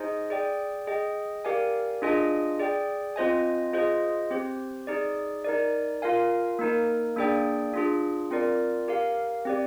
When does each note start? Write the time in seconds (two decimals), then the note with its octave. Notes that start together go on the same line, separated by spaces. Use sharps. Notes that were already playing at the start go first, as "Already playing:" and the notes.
Already playing: D#4 G#4 C5 D#5 G#5
0.30 G#4 D5 G5
0.87 G#4 D#5 G5
1.45 G4 A#4 D5 F5 G#5
2.02 D4 F4 G#4 D#5 G#5
2.59 G#4 D5 G5
3.16 C4 F4 C5 D#5 G#5
3.73 F4 G#4 C5 D#5
4.31 C4 G4 C5
4.87 D#4 G#4 D5
5.45 D#4 A#4 D5
6.02 F4 A#4 F5 G#5
6.59 A#3 D#4 A#4
7.16 A#3 D4 G#4 D5 G5
7.74 D4 F4 G#4
8.30 C4 F4 A#4 D5
8.88 G4 A#4 F5
9.45 C4 G4 D5